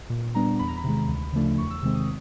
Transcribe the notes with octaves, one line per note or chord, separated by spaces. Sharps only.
A#2
G3 B3 D4 A#5
E2 B5
A#5
B5
C3 D#3 G#3
D2
C#3 F3 A3 D4
E2 C#6
E6
C3 D#3 G#3 C4 E6
D#6